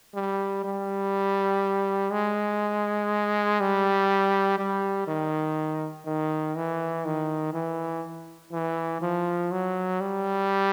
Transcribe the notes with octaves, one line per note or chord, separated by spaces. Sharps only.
G3
G3
G#3
G3
G3
D#3
D#3
E3
D#3
E3
E3
F3
F#3
G3